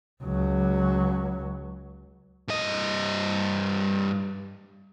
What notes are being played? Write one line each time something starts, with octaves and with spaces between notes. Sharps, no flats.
C#2 F#3
G2 D#5